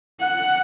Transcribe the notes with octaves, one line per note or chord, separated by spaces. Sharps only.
F#5